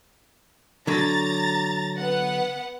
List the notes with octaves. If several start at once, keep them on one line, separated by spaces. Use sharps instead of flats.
D3 F#3 A#5 A6
B3 F#5